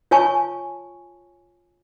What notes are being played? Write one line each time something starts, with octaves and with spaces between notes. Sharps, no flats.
F4 C#5 G#5 A5 C#6